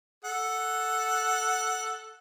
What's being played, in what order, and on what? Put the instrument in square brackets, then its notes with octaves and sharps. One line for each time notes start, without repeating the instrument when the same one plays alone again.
[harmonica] A4 F#5